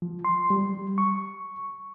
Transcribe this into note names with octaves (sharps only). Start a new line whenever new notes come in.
F3
C6
G3
C#6